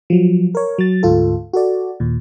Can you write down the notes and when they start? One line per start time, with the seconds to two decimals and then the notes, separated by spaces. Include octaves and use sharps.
0.10 F3 F#3
0.55 A#4 C#5
0.78 F#3 A6
1.03 D2 G#2 F4 A4
1.53 F#4 A4 D5
2.00 D#2 A#2